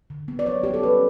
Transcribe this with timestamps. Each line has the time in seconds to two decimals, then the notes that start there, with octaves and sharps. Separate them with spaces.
0.10 D3
0.28 B3
0.39 D5
0.46 F#3 C#5
0.63 C#4 G4
0.74 A4
0.83 C#4 B4